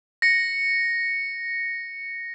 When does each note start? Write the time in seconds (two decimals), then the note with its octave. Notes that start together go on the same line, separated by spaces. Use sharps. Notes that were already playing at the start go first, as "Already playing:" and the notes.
0.22 A#6 C#7